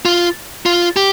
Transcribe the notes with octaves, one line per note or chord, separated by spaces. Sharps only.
F4
F4
G4